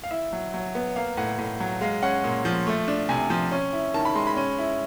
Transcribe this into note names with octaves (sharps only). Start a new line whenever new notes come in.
F5
E4 E5
F#3
F#3
B3
A#3 F5
A2 F#5
A2
F#3
G#3 F5
C#4 F#5
A#2
F3
A3
D4
C3 G#5
F3
C#4
E4
D#3 A5
B5
G#3 C6
B5
C#4
E4